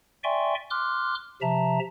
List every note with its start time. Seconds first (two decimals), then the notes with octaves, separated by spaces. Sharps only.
0.24 D5 E5 G5 G#5 C6 C#6
0.70 C6 D6 F6 F#6
1.42 C3 F3 E5 A5 A#5